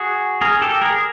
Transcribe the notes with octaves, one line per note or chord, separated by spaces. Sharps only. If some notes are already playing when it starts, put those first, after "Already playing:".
Already playing: F#4 G#4
G#4 A#4
G4 A4
G#4 A#4